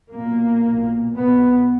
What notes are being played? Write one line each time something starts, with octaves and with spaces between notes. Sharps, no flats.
B1 A#2 A#3
B1 A#2
B1 B2 B3